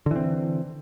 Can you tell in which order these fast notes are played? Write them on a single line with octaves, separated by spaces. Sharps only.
D3 E3 C4